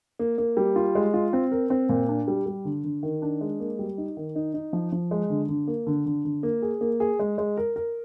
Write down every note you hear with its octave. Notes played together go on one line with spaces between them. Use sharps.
A#3
A#3
G3
F4
G#3
F4
C4
A#4
C4
A#2
D4
G3
G3
D3
D3
D#3
D4
G#3
A#3
G3
D#4
D#3
D#4
D#4
F3
F3
G#3
D3
D3
A#3
D3
D3
D3
A#3
G#4
A#3
G#4
G#3
G#3
A#4
A#4